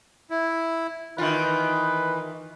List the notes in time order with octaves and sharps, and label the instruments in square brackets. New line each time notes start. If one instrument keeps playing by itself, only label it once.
[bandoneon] E4
[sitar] D#3 F4 [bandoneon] E3 [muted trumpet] B4